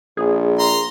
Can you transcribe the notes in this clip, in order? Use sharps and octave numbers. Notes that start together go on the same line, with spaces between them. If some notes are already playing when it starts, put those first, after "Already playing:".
A#1 G#4
A#4 A#5 C6